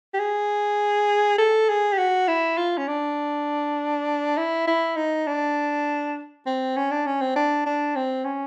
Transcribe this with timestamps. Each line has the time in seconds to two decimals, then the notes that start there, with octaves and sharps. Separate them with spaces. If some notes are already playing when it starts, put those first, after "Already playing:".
0.14 G4
0.19 G#4
1.38 A4
1.69 G#4
1.93 G4
1.98 F#4
2.28 E4
2.57 F4
2.78 C#4
2.88 D4
4.37 E4
4.67 E4
4.97 D#4
5.27 D4
6.46 C4
6.77 C#4
6.91 D4
7.06 C#4
7.21 C4
7.36 D4
7.66 D4
7.96 C4
8.25 C#4